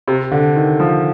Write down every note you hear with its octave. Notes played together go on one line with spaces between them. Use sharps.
C3
D3
D#3
F3